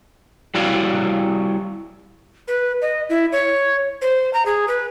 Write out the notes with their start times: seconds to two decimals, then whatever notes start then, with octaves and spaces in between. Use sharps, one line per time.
0.55 G3 E4 F#4 C#5 D5 F5
2.48 B4
2.82 D#5
3.10 E4
3.32 C#5
4.02 C5
4.33 A#5
4.46 G#4
4.68 B4